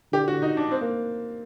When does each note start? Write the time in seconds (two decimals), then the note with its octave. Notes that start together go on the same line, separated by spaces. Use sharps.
0.13 D3 G4
0.28 F#4
0.42 D#4
0.57 D4
0.71 C4
0.81 A#3